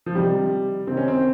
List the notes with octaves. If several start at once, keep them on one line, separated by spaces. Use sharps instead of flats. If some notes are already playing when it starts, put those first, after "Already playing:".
F3
C3 D#3 G3
C3 D#3 C4
C#4
C4